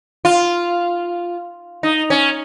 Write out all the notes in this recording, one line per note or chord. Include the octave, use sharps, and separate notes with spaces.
F4
D#4
C#4